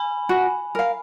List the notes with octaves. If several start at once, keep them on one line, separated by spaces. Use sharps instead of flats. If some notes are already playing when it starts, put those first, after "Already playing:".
Already playing: G#5 B5
F#4
A#4 F5